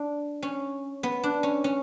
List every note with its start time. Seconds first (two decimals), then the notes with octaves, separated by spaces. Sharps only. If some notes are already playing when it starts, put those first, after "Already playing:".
Already playing: D4
0.42 C#4
1.03 B3
1.24 D4
1.43 C#4
1.64 C#4